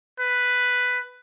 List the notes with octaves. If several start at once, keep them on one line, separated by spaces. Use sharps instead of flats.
B4